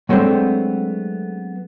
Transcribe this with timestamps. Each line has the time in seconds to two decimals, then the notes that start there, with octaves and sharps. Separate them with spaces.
0.09 F#3 G#3 A3 B3 C4 D4